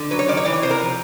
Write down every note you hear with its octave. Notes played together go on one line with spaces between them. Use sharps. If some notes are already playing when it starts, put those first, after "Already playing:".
Already playing: D3
F#3 B4
C#5
D#3 D5
C#5
E3 D5
C#5
C3 C5
A#4
F3